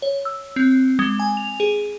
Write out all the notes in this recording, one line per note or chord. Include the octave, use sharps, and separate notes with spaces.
C#5
E6
C4
G#3
G#5
F7
G#4